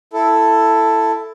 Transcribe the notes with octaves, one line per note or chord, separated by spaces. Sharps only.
E4 A4